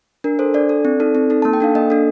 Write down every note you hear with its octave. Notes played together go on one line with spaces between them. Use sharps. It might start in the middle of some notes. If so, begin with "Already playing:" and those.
D4 A#4
A4 C5
D4 D5
A4
C4
D#4 A4
C4
D#4 A4
A#3 A5
G5
D4 A4 F5
A#3 D#5
D4 A4